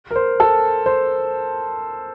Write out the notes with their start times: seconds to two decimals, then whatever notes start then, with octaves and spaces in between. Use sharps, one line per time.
0.11 A#4
0.16 C5
0.40 A4
0.86 C5